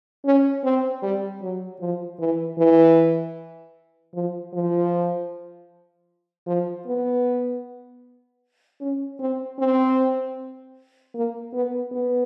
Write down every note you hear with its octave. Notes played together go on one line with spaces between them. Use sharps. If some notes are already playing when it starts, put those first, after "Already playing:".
C#4
C4
G3
F#3
F3
E3
E3
F3
F3
F3
B3
C#4
C4
C4
A#3
B3
B3